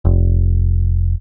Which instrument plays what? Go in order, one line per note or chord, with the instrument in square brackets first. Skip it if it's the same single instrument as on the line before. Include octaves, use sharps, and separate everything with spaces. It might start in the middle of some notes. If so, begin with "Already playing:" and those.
[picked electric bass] F1